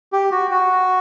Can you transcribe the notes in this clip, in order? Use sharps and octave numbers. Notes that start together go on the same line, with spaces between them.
G4
F#4
F#4